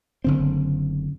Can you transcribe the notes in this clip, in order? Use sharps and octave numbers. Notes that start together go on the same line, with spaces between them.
F#1 D3 C4